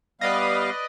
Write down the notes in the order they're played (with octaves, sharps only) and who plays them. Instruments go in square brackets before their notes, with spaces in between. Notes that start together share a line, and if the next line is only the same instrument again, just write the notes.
[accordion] G3 B3 F5 [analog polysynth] B4 D5 D#5